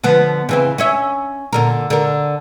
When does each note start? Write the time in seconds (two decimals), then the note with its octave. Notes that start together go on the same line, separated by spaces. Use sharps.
0.04 D3 F3 B3
0.49 C#3 E3 C4
0.78 C#4 C#5 E5
1.53 A#2 D3 A#4
1.90 D3 A#4